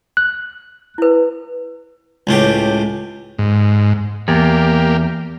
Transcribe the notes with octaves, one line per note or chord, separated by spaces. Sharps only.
F#6
E4 B4
C#2 A2 G4
G#2
E2 A#3 G4